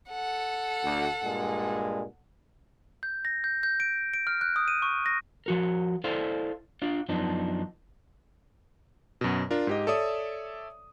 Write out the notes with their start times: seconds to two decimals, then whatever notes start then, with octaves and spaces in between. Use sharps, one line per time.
0.10 A4 F#5
0.83 D2
1.23 G2 A#2 G#3
3.03 G6
3.25 A#6
3.44 G6
3.63 G6
3.80 D7
4.14 D7
4.27 F6
4.41 F#6
4.56 D#6
4.68 D#7
4.82 C#6
5.06 A#6
5.46 F3 F#4 A#4
6.04 E4 A4 C5 D5 F5
6.82 D4 F4 D5
7.09 F#2 F3 B3 D4 D#4
9.21 F#2 B2
9.51 D4 F4 A#4
9.67 G#2 G4 D#5
9.87 A4 C#5 D5 E5 D#6